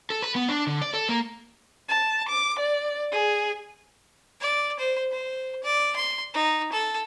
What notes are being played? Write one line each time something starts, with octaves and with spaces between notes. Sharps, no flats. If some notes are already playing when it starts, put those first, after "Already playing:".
A4
B4
B3
D4
D3
D5
A4
A#3
A5
D6
D5
G#4
D5
C5
C5
D5
C6
D#4
A4